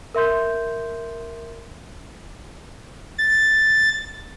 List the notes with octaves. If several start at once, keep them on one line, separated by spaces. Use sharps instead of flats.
A#4 E5 C6 G6
A6